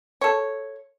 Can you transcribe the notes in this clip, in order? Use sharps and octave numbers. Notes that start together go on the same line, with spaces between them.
A4 C#5